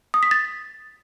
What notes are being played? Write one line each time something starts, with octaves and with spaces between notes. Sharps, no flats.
D#6
B6
A6